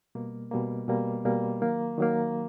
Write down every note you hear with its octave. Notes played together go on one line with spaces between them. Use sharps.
B2 G3 A#3
B2 G3 A#3
B2 G3 A#3
B2 G3 A#3
D#3 F#3 A#3
D#3 F#3 A#3